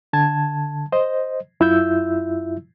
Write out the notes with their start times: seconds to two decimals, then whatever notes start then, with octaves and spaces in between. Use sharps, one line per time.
0.13 D3 A5 G#6
0.92 C5 D#5
1.60 F#2 E4 F4 E5 E6 G6